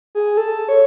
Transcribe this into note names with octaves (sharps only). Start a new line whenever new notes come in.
G#4
A4
C#5